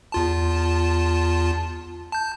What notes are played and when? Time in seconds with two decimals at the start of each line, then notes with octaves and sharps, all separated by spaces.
0.12 E2 F4 A5
2.12 A5 G6